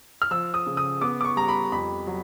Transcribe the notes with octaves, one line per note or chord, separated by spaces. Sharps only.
F6
F3 E6
D#6
C#3
D#6
B3 D6
D6
C#6
G3 A#5
B5
F2 B5
F#3